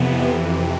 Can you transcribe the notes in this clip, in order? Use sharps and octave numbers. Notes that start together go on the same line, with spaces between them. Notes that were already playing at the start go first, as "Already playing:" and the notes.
Already playing: F2 C3 E3 B3